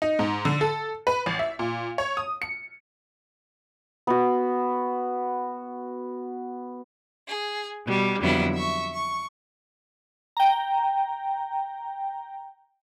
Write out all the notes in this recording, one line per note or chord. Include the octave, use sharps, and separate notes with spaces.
D#4
G#2
D3
A4
B4
A1
E5
A#2
C#5
D#6
C#7
B3 F#4
G#4
B2 G3
F2 D3 F#3 G3 B3 E4
E5 C#6
C#6
G5 A#5